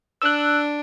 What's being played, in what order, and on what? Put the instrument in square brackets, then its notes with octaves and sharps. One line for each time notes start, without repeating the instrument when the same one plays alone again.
[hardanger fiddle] D4 [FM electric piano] E6 F#6